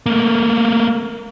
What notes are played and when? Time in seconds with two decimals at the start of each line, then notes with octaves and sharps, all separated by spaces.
0.06 A3 A#3